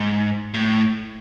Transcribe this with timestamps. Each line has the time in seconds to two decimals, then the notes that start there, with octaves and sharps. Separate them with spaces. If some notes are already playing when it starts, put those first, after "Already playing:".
Already playing: G#2
0.54 A2